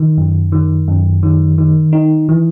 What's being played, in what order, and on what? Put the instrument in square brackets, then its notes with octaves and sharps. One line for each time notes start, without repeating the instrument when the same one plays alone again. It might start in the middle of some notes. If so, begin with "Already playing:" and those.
Already playing: [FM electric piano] D#3
F#2
D#3
F#2
D#3
D#3
D#4
E3